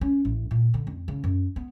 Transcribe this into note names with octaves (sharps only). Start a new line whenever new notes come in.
C#4
A1
A#2
D3
F2
C#3
F#2
B3